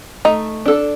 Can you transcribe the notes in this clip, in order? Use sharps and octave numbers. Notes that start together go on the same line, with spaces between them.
A3 D#4
D4 A4